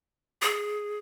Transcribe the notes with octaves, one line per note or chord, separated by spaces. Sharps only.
G#4